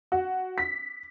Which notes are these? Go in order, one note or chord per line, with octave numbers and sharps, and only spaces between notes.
F#4
B6